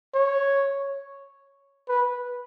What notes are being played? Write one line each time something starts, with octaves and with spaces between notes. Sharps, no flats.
C#5
B4